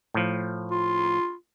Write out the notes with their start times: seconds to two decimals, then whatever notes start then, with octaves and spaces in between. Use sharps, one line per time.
0.14 A2 F3
0.71 F4